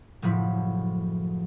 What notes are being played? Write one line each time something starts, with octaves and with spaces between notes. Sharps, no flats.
F#1 A2 F3 B5